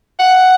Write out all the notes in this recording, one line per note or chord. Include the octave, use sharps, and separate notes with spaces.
F#5